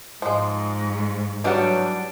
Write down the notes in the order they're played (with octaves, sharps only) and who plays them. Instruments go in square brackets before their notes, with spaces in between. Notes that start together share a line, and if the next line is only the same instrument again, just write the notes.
[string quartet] G#2 [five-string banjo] F3 G#3
[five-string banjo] E3 B3 F#5 [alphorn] F#3 [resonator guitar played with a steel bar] G3 D4